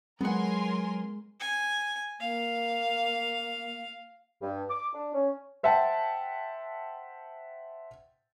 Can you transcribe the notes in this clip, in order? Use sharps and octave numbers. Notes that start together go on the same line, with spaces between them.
F#3 G#3 B3 A#4 F#5 G#5 C6
G#5
A#3 F5
G2
D6
D4
C#4
C5 E5 F#5 G5 A5